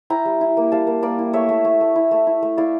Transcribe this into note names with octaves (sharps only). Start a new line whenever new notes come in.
E4 G5 A#5
G3
E4
A#3
G3 F5 A5
A#3
A#3 D5 F5
E4
A3 C#5 E5
A3
A3
A3
E4
A3
E4
A3
E4 D5 F5